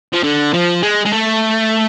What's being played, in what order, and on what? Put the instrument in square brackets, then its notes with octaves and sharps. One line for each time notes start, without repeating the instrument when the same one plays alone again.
[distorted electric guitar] F3
D3
F3
G#3
G#3
A3